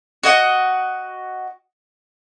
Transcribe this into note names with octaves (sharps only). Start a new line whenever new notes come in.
F#4 D#5 F#5